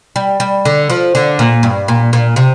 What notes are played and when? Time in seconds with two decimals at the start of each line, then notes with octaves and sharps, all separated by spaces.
0.16 G3
0.40 G3
0.65 D3
0.90 F3
1.15 D3
1.39 A#2
1.63 G2
1.88 A#2
2.13 A#2
2.36 C3